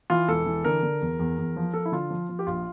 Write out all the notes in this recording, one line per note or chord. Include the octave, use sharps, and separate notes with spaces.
E3 F4
E1 A4
E3
D3 A#4
D3
E2
E2
E2
F3
F3 A4
E4
D3 F4
F3
F3
G4
A#1 F4